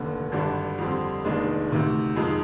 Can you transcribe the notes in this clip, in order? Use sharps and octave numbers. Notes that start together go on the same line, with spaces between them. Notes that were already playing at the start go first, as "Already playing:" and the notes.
Already playing: F1 D#2 D3
G#1 G2 D3 G3 D4
F2 D3 G3 C4
F1 D#2 D#3 G#3 D4
D2 C3 D#3
F2 D#3 G#3